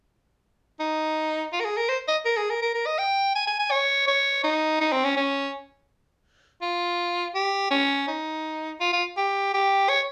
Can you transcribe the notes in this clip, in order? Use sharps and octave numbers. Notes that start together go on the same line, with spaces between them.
D#4
F4
A#4
G#4
A#4
C5
D#5
A#4
G#4
A#4
A#4
A#4
D#5
G5
G#5
G#5
G#5
C#5
C#5
D#4
D#4
C4
C#4
C#4
F4
G4
C#4
D#4
F4
F4
G4
G4
C#5